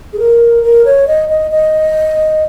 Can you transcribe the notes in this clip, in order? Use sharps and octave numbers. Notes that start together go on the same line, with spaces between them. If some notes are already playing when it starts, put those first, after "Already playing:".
G#4
A#4
A#4
C#5
D#5
D#5
D#5